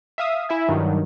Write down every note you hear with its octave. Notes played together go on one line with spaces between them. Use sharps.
E5 F5 D#6
E4 E5 G#5
G2 D#3 F#3